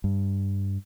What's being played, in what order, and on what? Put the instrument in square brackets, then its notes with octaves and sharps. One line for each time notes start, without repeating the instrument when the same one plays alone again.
[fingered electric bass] G2